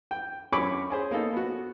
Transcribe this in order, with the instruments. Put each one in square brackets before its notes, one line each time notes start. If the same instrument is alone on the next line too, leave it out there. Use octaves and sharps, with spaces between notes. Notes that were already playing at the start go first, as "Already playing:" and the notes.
[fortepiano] G5
F#2 C#5 G#5 B5 C#6 D6
C#4 G#4 C5
A#3 B3 D#4 A4
B3 F#4